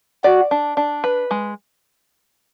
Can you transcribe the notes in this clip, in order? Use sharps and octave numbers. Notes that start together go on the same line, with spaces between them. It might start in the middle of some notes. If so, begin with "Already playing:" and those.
F#4 D5
D4
D4
B4
G#3